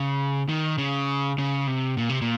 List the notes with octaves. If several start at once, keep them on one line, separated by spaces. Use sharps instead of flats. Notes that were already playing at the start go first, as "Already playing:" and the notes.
Already playing: C#3
D#3
C#3
C#3
C3
A#2
C3
A#2